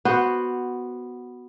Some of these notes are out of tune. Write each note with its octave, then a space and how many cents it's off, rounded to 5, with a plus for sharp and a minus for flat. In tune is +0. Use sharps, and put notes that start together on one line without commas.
B3 +0 F#4 +0 C5 +0